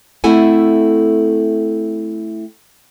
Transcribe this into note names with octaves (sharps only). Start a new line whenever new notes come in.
A3 C4 E4 A4 F#5 G#5